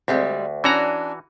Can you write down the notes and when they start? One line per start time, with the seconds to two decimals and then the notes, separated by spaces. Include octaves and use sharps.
0.08 D2 G3 G#3 C4
0.64 E3 C#4 D4 F#4 A#5